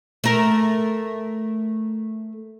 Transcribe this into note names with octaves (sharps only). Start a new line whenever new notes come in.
A3 A#4